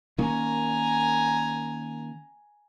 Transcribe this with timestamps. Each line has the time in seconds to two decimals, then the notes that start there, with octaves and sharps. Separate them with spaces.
0.18 D#3 A#3 C#4 G#5 A#5